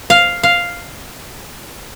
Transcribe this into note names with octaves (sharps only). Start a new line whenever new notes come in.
F5
F5